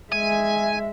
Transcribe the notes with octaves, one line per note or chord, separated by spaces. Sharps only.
G#3 E5 G#5